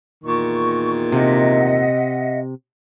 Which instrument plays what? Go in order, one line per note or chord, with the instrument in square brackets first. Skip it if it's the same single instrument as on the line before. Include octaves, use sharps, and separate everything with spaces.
[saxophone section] E2 A#2 D#3 [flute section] C#6
[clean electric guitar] C3 [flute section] D#5 E5 F#5